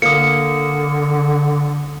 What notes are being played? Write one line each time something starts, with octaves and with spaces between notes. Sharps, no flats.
D3 A#3 D#6 C#7